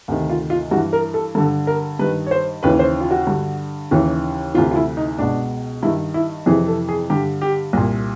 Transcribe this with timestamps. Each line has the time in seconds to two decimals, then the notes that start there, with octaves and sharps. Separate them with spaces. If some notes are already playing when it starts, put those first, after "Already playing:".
0.08 D2 C3 D#3
0.30 F4
0.50 F4
0.71 G2 E3 F#4
0.93 A#4
1.14 A4
1.35 G2 D3 A4
1.67 A#4
1.99 G2 D#3 B4
2.26 C#5
2.31 C5
2.63 D#2 C#3 E3 B4
2.79 C5
3.00 F4
3.11 F#4
3.27 G2 D3
3.91 D#2 C#3 E3
4.54 D2 C3 E3 F4
4.71 F4
4.76 E4
4.97 D#4
5.18 C#2 B2 D4
5.83 G2 D#3 E4
6.14 E4
6.46 F2 C3 E3 G#4
6.68 A4
6.89 G#4
7.10 G2 D3 G4
7.42 G4
7.73 C2 A#2